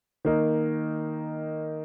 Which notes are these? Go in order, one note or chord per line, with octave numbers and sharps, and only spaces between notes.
D#3 A#3 D#4